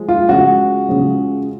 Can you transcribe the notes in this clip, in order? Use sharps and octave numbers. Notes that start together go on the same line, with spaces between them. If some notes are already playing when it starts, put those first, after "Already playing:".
Already playing: F3 G#3
F4
C#3 F3 G#3 F#4
C#3 F3 G#3